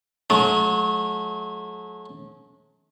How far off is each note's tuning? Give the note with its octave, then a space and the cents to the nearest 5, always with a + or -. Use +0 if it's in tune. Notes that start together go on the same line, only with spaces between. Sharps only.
F#3 -30 A3 -45